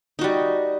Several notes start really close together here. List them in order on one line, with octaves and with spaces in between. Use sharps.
D#4 F#4 G3